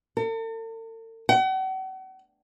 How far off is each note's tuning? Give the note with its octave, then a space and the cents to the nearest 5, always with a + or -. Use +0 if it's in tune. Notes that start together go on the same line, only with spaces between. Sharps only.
A4 +45
F#5 +40